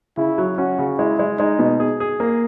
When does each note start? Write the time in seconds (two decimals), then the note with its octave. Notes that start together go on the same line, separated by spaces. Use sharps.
0.17 C#3 E4
0.38 F#3
0.58 C#4 F#4
0.79 C#3
0.98 G#3 E4
1.19 G#3
1.39 G#3 D#4
1.59 B2
1.80 G#4
2.00 G#4
2.20 A#3